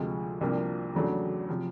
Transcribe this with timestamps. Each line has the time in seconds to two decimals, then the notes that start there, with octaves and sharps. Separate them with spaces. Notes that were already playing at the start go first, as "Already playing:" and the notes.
Already playing: D2 C3 F3 G#3
0.41 C2 C3 F3 A#3 D4
0.95 E2 C#3 F#3 A3 D4
1.49 C3 F3